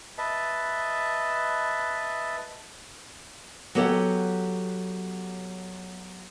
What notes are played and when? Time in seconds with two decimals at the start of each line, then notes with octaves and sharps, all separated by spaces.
0.18 B4 D#5 E5 A5
3.75 F#3 B3 G4 A4 C#5 F#5